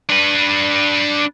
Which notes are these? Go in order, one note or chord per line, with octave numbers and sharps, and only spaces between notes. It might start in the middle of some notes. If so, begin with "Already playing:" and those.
D4 B4